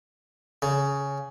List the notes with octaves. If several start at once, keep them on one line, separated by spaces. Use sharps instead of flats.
C#3